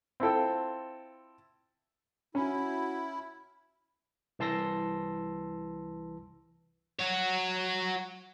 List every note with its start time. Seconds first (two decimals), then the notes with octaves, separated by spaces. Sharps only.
0.20 C4 E4 F4 A4 G5
2.35 C#4 E4 F#4
4.39 C2 E3 A5 C6 E6 A#6
6.99 F#4 C#5